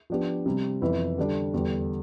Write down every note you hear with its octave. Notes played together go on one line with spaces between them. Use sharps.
F3 B3 D4 G4
C3 G3 C4
F2 E3 B3 E4 B4
D3 G3 D4
E2 D3 G3